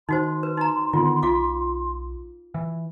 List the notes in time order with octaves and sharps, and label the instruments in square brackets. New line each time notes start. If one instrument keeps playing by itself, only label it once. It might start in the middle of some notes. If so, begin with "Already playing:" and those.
[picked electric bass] D#3 [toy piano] D#4 F#4 C5 [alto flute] C6
[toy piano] B4
D#4 A#5
[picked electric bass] D3 D#3 B3 [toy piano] F4
[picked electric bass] B1 [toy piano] F4 F5 D6
[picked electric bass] E3